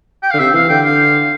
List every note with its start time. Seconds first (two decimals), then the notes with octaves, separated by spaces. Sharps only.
0.23 G5
0.31 F5
0.34 D3
0.39 C3 E5
0.53 E3 F5
0.69 D3 G5
0.85 F5